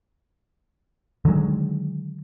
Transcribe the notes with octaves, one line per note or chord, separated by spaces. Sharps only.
D3 D#3 F#3 G#3